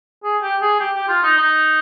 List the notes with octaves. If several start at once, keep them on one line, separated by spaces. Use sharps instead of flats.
G#4
G4
G#4
G4
G4
F4
D#4
D#4